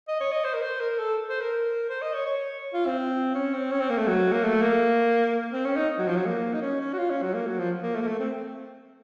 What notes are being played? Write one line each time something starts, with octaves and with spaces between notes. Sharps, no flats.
D#5
C#5
D#5
C5
A#4
C5
A#4
A4
C5
A#4
C5
D#5
C#5
C#5
F4
C4
C#4
C4
C#4
C4
A#3
A3
F#3
A#3
A3
A#3
C4
C#4
D#4
F#3
F3
F#3
A#3
D#4
C#4
C#4
F#4
F4
C#4
F#3
A#3
F#3
F3
A#3
A3
A#3
A3
C4